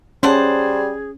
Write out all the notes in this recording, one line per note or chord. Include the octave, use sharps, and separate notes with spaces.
G3 C#4 G#4 C5 F#5 A5